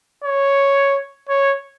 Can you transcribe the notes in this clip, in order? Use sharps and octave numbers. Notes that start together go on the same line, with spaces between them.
C#5
C#5